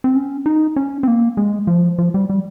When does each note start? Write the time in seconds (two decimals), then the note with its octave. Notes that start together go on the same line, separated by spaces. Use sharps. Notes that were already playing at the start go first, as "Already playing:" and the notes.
0.04 C4
0.16 C#4
0.46 D#4
0.76 C#4
1.03 C4
1.08 A#3
1.37 G#3
1.67 F3
1.99 F3
2.14 G3
2.30 G3